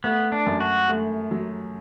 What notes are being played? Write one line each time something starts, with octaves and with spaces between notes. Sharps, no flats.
A3 B3
D4
F#2
F#4
A3
F#3